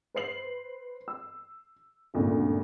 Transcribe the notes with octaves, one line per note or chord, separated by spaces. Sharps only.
B4 C5 C7 F#7
E6
G#1 D2 G2 A#2 C#3